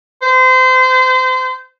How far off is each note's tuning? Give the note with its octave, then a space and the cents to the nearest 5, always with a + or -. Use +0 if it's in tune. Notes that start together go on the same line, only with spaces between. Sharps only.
C5 -30